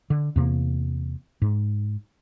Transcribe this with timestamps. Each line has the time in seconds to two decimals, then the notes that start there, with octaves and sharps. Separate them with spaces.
0.10 D3
0.36 E2 C3 A#3
1.42 G#2